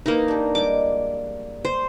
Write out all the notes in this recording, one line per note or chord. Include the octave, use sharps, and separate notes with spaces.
A#3 D#4 E4 B4
D4 G4
G3 G#3 D6
C5